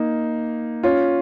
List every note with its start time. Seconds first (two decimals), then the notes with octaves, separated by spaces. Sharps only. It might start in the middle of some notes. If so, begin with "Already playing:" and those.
Already playing: A#3 D#4
0.83 C#4 F4